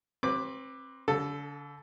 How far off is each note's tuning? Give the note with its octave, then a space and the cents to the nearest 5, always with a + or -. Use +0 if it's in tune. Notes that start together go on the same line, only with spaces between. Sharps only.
C4 +30 B4 +0 D6 +5
D3 -40 A4 +5